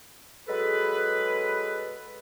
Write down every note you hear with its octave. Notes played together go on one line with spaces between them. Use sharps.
F#3 G#3 G#4 A4 B4